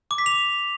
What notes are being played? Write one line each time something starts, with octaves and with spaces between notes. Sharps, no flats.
D6
B6
F7